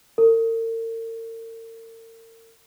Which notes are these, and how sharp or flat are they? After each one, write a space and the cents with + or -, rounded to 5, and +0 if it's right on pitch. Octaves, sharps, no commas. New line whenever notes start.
A#4 -45